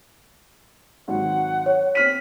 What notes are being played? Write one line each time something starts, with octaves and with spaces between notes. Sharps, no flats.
G#1 D#3 F#3 F#5
C#5
C4 F6 B6 D#7